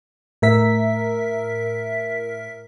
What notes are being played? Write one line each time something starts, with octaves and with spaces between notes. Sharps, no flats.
A2 A#4 E5 B6